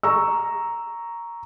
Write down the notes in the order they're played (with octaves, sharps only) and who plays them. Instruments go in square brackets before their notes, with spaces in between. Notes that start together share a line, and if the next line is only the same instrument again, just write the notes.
[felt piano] A#5 C#6 E6